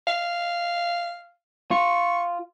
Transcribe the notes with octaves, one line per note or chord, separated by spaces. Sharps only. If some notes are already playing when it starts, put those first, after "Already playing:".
F5
F4 C#6